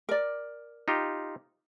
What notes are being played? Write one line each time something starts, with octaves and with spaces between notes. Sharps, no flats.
A#4 D5
D#4 F4 G4